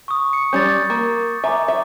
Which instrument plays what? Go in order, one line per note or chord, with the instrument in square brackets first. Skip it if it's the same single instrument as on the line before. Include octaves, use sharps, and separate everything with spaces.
[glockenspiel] C#6 D#6
C#7
[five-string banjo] G3 C#4 [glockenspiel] G6 A6
[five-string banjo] A#3
[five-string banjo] E5 [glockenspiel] G#5 A#5 D6
[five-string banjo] E5 [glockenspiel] G#5 D6